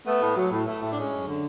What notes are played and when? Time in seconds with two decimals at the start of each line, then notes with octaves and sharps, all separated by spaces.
0.06 A3 B3
0.21 A2
0.36 F#3
0.52 A2
0.67 A3
0.83 A2
0.91 D4
0.97 G#3 C#4
1.12 F#2
1.27 D3